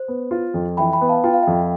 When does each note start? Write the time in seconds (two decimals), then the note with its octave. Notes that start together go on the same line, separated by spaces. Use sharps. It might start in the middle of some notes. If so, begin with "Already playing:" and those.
Already playing: C5
0.08 B3
0.31 F4
0.54 F2
0.77 E3 G5 B5
0.93 G5 B5
1.01 B3
1.09 F5 A5
1.24 F4 G5
1.33 F5
1.43 F2 E5 G5